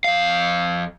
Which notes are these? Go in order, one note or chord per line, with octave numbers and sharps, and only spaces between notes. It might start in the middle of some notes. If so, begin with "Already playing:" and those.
F2 F5